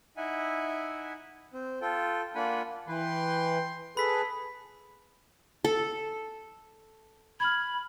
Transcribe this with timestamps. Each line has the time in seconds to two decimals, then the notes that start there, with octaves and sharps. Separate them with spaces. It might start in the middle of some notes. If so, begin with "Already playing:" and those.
0.17 D#4 E4 E5 F#5 G#5
1.53 C4
1.81 F4 A4 G5
2.35 A#3 D4 F4 F#5 G#5 B5
2.88 E3 B4 G5 C6
3.97 G#4 A4 B4 B5 B6
5.64 A4
7.40 B5 F6 G#6